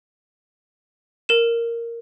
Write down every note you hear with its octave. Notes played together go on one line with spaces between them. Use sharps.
A#4 E7